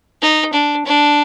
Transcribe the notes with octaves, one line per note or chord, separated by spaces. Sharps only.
D#4
D4
D4